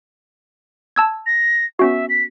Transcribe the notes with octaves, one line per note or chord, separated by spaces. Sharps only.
A5 E6 G#6
A#6
B3 C#4 F#4 E5
B6